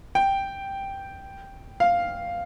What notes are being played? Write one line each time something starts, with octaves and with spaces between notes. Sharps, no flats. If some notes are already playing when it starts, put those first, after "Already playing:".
G5
F5